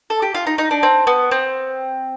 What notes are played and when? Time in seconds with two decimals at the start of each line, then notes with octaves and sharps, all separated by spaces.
0.10 A4
0.22 G4
0.34 F4
0.47 D#4
0.58 D#4
0.71 D4
0.83 C4
1.07 B3
1.31 C4